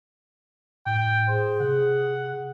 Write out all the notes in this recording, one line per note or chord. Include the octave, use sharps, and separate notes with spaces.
A2 G5
G#4 C5
C3 F#5